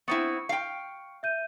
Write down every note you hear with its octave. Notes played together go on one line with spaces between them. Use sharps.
B3 C4 E4 C#6 C#7
F5 G5
E5 G6 D#7